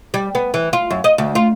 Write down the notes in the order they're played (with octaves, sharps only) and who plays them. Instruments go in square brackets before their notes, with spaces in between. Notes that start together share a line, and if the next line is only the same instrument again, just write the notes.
[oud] G3
B3
E3
F4
F#2
D#5
D2
F4